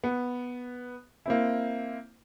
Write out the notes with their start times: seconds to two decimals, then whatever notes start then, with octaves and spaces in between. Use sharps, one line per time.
0.04 B3
1.26 A#3 C4 E4